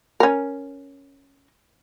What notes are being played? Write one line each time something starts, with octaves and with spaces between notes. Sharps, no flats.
C#4 A#4